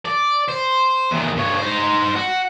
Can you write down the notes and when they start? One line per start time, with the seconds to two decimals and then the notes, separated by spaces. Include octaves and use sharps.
0.05 D5
0.49 C5
1.11 E2 D#3
1.36 G2 C#5
1.58 D#4 C5
2.16 F#4